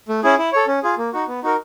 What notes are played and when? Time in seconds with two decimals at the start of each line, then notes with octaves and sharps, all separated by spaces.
0.09 A3
0.23 C#4 E4 G#4
0.38 E4
0.52 A4 C#5
0.67 C#4
0.83 F4 G#4
0.98 A#3
1.13 D#4 F#4
1.28 B3
1.43 D#4 F#4 A#4